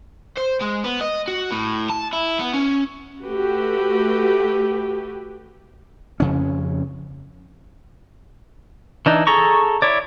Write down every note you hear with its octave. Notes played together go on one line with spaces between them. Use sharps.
C5
G#3
B3
D#5
F#4
A2
A5
E4
B3
C#4
A3 F#4 G4 B4
F2 C#3 C#4
E3 D4 D#4
G#4 A4 A#5 C#6
E4 C#5 D5